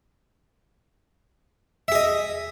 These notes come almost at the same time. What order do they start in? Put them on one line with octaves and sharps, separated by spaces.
E5 G#4 D#5